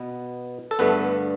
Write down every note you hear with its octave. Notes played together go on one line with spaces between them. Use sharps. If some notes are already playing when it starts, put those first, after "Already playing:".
Already playing: B2 B3
A4
G2 D3 A3 B3 B4